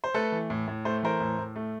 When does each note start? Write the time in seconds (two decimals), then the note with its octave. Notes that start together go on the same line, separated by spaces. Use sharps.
0.04 C5
0.14 A3 A4 B4
0.32 E3
0.50 A2
0.68 A2
0.85 A3 C5
1.03 E3 A#4 C5
1.20 A2
1.38 A2
1.56 A3